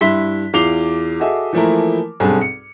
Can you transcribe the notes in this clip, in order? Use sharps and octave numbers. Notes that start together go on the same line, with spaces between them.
G2 E4 E5 C6 B6 G7
E2 F4 D6 C7 F7 G7
F#4 G#4 A4 D#5 E5
E3 F3 A3 A#3 E4 A#4
B1 G2 C4 G#4 A4
C#7